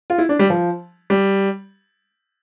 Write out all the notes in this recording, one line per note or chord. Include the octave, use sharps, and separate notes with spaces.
F4
E4
D4
G3
F3
G3